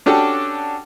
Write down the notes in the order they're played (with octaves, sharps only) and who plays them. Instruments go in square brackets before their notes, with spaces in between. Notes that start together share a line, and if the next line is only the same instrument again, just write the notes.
[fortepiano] C#4 D4 F#4 G4 A4